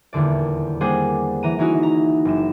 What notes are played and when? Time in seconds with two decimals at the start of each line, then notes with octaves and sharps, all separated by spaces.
0.13 D#1 E2 D3 D5
0.80 G3 A#3 D4 G#4 C5 F#5
1.43 E3 A#5 D#7
1.59 E3 C#4 D#4 E4 F#4
1.83 A#5
2.25 F#1 E7